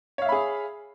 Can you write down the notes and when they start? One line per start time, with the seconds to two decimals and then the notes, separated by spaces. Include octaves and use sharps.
0.18 C#5
0.22 F5
0.25 E5
0.29 B5
0.32 G#4